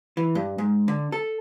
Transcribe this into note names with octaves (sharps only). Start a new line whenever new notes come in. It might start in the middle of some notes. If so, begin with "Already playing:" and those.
E3
G2
G#2
D3
A4